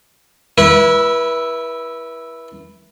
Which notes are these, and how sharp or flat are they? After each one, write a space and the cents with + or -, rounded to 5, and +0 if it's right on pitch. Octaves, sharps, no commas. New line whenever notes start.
E4 +0 B4 -30